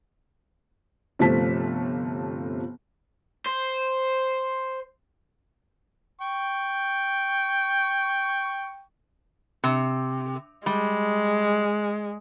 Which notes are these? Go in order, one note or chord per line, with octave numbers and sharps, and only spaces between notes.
G1 C3 F3 A3 A5 B6
C5
G5 C#6
C3
G3 G#3